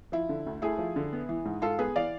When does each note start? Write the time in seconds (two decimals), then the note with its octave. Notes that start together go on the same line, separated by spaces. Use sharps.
0.12 F3 E4
0.29 D3
0.46 D2
0.62 A3 E4 G#4
0.78 F3
0.96 D3
1.13 B3
1.29 E3
1.45 G#2
1.62 G#2 F4 A4
1.79 B3 G#4 B4
1.95 E3 D5 F5